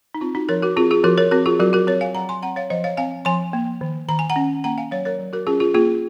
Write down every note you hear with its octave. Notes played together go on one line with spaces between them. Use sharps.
D#4
C4 F4
D#4 F#4
F3 A#4 C#5
F#4 A#4
C4 F4 G#4
F4 G#4
F3 F#4 A#4
A#4 C#5
C4 F#4 A#4
F4 G#4
F#3 F#4 A#4
F#4 A#4
C4 A#4 C#5
F5 G#5
F#3 F#5 A#5
G#5 C6
C4 F#5 A#5
C#5 F5
F3 C5 D#5
C#5 F5
C4 F5 G#5
F3 G#5 C6
A#3
D#3
D#3 A#5
G#5
F#5 A#5
C#4
A#3 F#5 A#5
F5 G#5
F#3 C#5 F5
A#4 C#5
F#3
F#4 A#4
C#4 F4 G#4
F4 G#4
A#3 F4 G#4